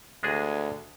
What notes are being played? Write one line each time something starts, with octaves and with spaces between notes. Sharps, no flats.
D2 G#3 D4 G#4